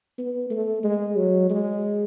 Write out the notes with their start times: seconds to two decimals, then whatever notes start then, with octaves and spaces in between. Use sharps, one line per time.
0.18 B3
0.50 A3
0.84 G#3
1.17 F#3
1.50 G#3